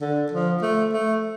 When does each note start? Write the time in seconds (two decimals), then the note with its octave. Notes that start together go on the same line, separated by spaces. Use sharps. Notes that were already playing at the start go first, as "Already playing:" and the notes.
0.01 D3
0.31 F3
0.62 A3
0.93 A3